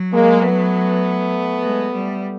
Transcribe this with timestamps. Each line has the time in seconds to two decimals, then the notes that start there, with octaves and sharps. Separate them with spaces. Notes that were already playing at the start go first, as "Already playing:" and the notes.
Already playing: F#3
0.12 G#3 A#3
0.41 A3 B3
1.62 G#3
1.92 G3